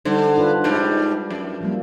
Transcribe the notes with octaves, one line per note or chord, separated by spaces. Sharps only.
D3 G3 D#4 C5
D4 F4 B4
G#2 G3
F#2
F3 G3 A#3